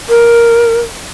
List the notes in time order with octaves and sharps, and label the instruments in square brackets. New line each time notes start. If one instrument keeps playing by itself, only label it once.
[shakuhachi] A#4